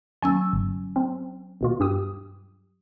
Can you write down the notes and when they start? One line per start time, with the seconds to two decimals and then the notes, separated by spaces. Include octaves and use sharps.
0.23 D#2 F#3 C#4 G#5 E6
0.53 G1
0.96 C4
1.61 D#2 B2 F4
1.80 G2 G4 D#6